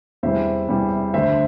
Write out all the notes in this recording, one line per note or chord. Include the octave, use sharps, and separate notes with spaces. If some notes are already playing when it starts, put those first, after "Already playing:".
E2 C3 G3 C5 E5
E2 C3 G3
D2 D3 A3 C5 E5